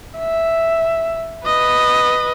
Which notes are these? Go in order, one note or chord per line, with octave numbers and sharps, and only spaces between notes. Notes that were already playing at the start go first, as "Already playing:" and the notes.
E5
B4 D#5